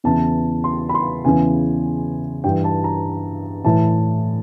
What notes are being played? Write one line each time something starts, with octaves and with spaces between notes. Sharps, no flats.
E2 C#3 E3 A5
C6
B5
C6
E2 C#3 E3 G#5
G2 E3 G5
A5
A#5
A2 E3 A5